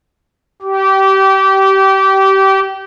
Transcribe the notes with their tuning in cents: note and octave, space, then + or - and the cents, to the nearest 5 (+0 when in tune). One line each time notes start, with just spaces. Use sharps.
G4 -25